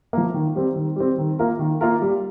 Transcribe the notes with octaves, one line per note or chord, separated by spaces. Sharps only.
F3 A#3
D#3
G3 C4
D#3
G3 C4
D#3
A#3 F4 A#4
D#3
A#3 F4 A#4
G3